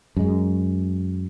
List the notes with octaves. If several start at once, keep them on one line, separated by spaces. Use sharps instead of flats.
F#2 G#3